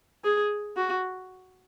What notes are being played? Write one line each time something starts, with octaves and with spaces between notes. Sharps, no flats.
G#4
F#4